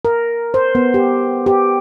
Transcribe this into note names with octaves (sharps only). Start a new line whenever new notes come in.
A#4
C5
B3
G4
G4